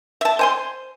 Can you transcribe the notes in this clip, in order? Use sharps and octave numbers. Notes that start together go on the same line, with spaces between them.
E5 A5
C5 G#5 C6